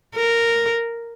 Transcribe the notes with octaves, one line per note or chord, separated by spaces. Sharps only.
A#4